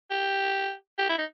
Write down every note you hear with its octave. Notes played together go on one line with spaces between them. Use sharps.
G4
G4
E4
D#4